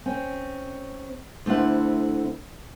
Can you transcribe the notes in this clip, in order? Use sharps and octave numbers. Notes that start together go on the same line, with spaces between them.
C4 C#4
D2 A3 C4 E4 F#5